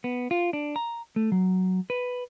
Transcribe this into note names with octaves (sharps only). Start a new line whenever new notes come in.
B3
F4
D4
A#5
A3
F#3
B4